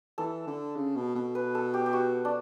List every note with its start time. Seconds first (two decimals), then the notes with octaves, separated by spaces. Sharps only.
0.18 E3 A4
0.47 D3
0.76 C#3
0.96 B2
1.15 B2
1.35 B4
1.55 A4
1.74 G4
1.86 G4
1.93 F#4
2.25 D4